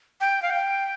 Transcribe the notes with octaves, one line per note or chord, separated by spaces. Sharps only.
G5
F5
G5